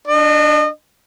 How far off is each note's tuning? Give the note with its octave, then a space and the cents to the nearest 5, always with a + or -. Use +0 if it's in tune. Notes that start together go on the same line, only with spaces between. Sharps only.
D4 +0 D#5 -35